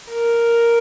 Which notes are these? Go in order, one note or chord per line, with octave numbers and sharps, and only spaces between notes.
A#4